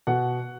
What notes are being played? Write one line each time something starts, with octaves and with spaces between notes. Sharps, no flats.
B2 F#5